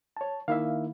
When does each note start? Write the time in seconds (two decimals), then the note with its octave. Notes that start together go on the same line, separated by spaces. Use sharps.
0.17 C#5 A5
0.48 D#3 A#3 E4 E5 F5